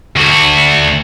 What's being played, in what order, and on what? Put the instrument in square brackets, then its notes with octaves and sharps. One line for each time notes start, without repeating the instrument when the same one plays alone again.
[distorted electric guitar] D2 F#4